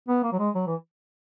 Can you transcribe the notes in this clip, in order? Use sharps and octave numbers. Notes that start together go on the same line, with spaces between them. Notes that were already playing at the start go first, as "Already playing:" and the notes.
B3
A#3
F#3
G#3
F#3
E3